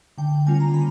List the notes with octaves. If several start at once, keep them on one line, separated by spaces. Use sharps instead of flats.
D3 G5
G3 A#3 C#4 F4 G#5
A#5
D3 B5